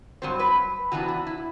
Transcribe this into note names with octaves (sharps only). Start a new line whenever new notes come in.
G2 F#3 C4 C5
B4
C3 E3 B3 D4 F#4
F#4
E4